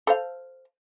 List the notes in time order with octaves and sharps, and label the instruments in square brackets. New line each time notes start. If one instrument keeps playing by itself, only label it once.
[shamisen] A4 C5 F5